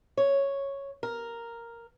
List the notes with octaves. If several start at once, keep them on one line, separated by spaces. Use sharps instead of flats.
C#5
A#4